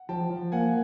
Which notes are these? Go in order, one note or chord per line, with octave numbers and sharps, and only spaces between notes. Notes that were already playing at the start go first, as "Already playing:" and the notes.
Already playing: F#5
F3 G5 A5
F3
A#3 F#5 G#5